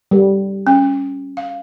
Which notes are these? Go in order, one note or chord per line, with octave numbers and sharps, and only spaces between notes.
G3
C#4
F5